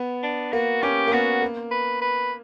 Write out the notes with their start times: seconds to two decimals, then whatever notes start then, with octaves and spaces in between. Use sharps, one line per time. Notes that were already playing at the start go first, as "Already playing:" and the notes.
Already playing: B3
0.23 D4
0.53 A#3 F#4
0.83 C#4 G4
1.07 A#3
1.12 B3 F#4
1.42 A#3
1.71 B4
2.02 B4